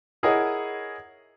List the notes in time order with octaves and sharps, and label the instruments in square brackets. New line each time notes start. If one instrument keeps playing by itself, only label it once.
[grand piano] E4 G#4 A#4 C#5 D#5 F#5